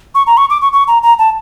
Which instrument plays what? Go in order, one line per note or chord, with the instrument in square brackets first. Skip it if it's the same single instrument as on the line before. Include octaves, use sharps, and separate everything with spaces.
[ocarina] C#6
A#5
C#6
D6
C#6
C#6
A#5
A#5
A5